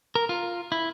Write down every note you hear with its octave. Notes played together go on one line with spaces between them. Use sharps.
A#4
F4
E4